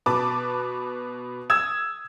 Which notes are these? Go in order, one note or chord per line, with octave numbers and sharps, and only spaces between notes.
B2 B4 A5 D6
D#6 E6 G#6 E7